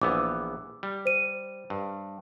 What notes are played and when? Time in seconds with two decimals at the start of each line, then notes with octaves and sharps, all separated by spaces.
0.02 A#1 E3 B3 D6 E6
0.83 G3
1.05 C5 D#7
1.70 G2